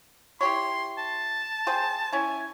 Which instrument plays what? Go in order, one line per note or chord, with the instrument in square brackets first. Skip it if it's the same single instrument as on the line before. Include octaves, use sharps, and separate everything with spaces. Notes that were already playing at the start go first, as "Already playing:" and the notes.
[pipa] E4 G4 C#5 [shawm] C6
[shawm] A5
[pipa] G#4 C5 G5
[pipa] C#4 E4 [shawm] G#5